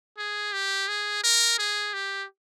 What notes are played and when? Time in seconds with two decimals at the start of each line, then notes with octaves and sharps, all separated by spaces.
0.18 G#4
0.53 G4
0.88 G#4
1.24 A#4
1.59 G#4
1.94 G4